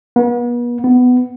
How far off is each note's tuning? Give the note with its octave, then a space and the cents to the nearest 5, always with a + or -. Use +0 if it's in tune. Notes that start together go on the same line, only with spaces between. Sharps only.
B3 -40
B3 +15